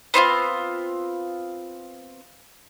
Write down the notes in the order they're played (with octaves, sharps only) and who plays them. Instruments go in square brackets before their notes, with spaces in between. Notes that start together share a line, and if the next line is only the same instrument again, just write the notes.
[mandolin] B3 C4 D#4 F4